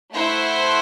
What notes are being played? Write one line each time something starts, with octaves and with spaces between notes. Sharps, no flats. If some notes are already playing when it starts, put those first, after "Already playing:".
A3 E4 A4 C5 F#5